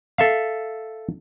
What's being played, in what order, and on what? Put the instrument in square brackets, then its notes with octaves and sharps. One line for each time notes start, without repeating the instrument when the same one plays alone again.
[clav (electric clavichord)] A4 E5 F5